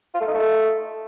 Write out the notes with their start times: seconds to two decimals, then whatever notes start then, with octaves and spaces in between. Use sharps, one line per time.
0.14 F4
0.21 A3
0.27 D#4
0.34 A3